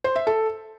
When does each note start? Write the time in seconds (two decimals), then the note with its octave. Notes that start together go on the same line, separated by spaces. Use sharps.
0.04 C5
0.16 E5
0.27 A4